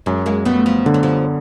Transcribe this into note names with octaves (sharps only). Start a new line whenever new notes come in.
F#2 F#3 G#3
G#3 A#3
G3 A3 B3
F3 G3
D3 G3
F#3
F3 G3